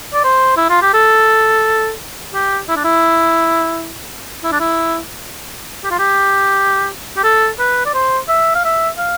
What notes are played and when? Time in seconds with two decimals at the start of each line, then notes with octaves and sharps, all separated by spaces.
0.13 D5
0.24 C5
0.57 E4
0.70 F4
0.82 G4
0.94 A4
2.34 G4
2.69 E4
2.76 D4
2.84 E4
4.44 E4
4.52 D4
4.60 E4
5.84 G4
5.90 F4
5.99 G4
7.17 G4
7.23 A4
7.59 B4
7.85 D5
7.94 C5
8.28 E5
8.55 F5
8.64 E5
8.98 F5